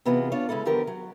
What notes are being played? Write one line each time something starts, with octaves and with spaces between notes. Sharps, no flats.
C3 E3 B3 F4 F#4 G#4
D4 F4 C#5
C#3 G#3 C#4 E4 A4
D3 D#3 F3 B3 G4 A#4
F#3